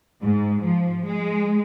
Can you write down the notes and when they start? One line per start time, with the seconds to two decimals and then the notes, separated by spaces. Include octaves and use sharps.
0.22 G#2
0.64 F3
1.05 G#3